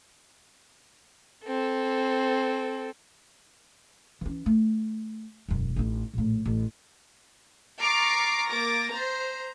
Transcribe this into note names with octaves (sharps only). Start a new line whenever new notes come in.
C4 A4
E3 C#4
A3
E1 F#2
A1 D#4
A#1 A2
A1
A#5 C#6 D6 F6 A6 C7
A#3 D6 A6 A#6
C5 A#5